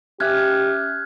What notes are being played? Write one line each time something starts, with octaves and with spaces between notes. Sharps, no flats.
C#4 G4 E5 D6 F6 F#6 G#6